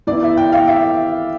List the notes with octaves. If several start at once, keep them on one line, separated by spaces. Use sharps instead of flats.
E3 B3 E4 D5
E5
G5
F5
E5